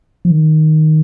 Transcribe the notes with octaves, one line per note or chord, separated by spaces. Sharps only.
F3
D#3